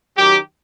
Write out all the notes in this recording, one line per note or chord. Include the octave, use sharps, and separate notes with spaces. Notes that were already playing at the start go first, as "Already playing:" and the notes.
F#2 D#3 F#3 G4